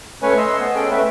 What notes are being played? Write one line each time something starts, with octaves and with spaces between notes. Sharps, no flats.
A3 C#4 B4 C#5 G#5
D#5 C6 E6
B3 C5 D#5
C#4 G#4 A4 G5
A3 C#4 B4 E5